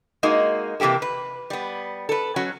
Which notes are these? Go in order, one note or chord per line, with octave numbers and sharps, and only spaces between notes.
G#3 A#3 D#4 F#4
C3 E3 A#3 G4 A4
B4
G3 B3
A4 B4
F#3 C#4 F#4